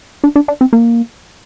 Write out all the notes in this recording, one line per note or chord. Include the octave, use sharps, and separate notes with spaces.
D4
D4
D4
C4
A#3